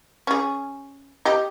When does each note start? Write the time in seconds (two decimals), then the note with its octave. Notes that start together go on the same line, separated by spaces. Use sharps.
0.27 C#4 G#4
1.25 G4 D#5